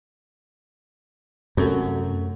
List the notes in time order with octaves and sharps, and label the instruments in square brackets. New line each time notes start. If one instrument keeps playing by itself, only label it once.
[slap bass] F#2 [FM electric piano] C3 A3 F#4